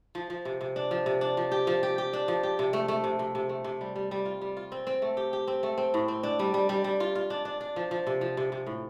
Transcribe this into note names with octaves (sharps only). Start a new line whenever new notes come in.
F3
F3
C3
C3
D4
F3
C3
D4
F3
G4
F3
G4
G4
D4
F3
G4
C3
A3
A3
C3
C3
C3
A3
C3
G3
G3
G3
F4
G3
F4
C4
C4
A3
G4
G4
C4
A3
C4
A2
C4
D4
G3
G3
G3
G3
F4
F4
D4
D4
D4
F3
F3
C3
F3
C3
C3
A2